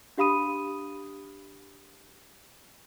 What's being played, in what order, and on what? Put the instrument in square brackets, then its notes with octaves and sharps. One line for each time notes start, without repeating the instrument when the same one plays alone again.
[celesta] D4 G4 F5 B5 D#6 D#7